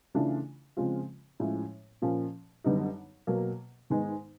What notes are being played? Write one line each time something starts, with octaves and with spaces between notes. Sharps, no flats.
C#3 E3 A3 D4 F4
C#3 F3 G#3 C4 F4
A2 F3 G#3 C#4 E4
A#2 F3 A#3 C#4
F#2 D3 G3 B3 D#4
B2 F#3 A#3
G#2 D#3 G#3 B3 D#4